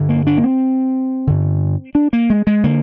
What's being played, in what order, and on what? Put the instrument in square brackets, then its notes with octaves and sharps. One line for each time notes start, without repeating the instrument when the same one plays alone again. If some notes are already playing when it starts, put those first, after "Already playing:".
Already playing: [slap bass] G2 D3
A#3
D4
A#3
C4
G2 D3
D4
A#3
G#3
G#3
D3 A#3